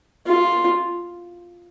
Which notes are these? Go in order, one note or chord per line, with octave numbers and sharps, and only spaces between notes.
F4